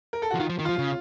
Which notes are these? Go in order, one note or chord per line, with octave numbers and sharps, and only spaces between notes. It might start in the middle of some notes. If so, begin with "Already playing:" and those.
A#4
A4
F#4
F3
D#3 F4
F3
D#3
F3 F4
C#3